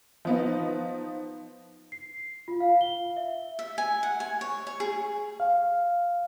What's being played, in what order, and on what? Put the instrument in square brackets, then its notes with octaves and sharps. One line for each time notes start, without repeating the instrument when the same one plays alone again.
[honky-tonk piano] F3 B3 D#4
[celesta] C7
F4
F5
G7
E5
[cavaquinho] E5
G#5
F#5
G#5
C#5
C#5
G#4
[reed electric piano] F5